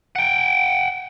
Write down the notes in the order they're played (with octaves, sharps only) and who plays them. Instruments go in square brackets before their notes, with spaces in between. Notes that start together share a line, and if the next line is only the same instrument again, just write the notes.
[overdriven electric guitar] F#5 G5